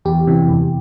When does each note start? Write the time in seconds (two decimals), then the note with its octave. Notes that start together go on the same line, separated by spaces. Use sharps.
0.05 E2 G4
0.27 C3 E3
0.49 E2